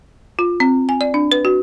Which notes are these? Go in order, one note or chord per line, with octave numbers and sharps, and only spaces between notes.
F4
C4
G#5
D5
D4
B4
F#4